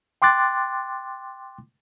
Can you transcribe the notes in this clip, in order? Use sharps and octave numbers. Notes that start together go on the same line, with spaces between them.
G5 C6 D6 F#6 A6